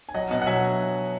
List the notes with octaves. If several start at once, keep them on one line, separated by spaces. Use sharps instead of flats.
G#5
F#3 D#5 F#5
B2 D#5 F#5
F#5
F#3 E5 G#5